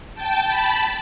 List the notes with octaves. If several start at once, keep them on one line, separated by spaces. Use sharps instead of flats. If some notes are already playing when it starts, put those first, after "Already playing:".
G5 A5
A5 B5